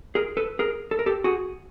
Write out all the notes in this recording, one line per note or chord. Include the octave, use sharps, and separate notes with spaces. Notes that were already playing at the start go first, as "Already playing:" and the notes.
G#4 A#4
A4 B4
G#4 A#4
A4
A#4
G4 A4
F#4 G#4